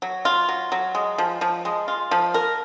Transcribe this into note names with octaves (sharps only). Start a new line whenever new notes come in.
F#3
F4
F#3
F#3
G#3
F3
F3
G#3
F4
F3
A#4